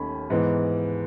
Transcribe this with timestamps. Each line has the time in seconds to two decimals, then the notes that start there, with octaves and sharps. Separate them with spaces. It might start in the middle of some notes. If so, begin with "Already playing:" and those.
Already playing: D#2 D#3 A3 C#4 B5
0.30 G#2 E3 B3